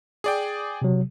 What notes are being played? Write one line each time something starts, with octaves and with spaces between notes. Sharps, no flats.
G#4 D5 G5
C3 F#3